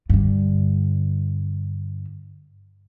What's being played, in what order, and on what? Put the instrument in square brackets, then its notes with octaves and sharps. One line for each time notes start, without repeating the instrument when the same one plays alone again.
[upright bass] G2 D3